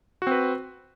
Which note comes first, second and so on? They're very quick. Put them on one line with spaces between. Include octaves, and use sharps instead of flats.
F#4 C4 B4